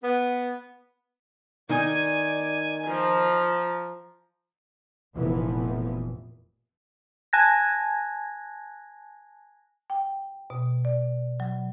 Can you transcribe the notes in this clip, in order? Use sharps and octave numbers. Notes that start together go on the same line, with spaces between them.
B3
D#3 D#4 D5 G#5
F3 A#5
F1 A#2 E3 F3 B3
G#5 A5 F#6 G#6 A#6
G5
B2
D5
F#3